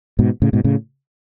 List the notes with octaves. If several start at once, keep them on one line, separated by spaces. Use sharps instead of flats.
G#2 B2
A2 C#3
G#2 B2
A2 C#3